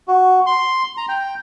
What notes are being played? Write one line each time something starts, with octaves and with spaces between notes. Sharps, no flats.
F#4
C6
A#5
G5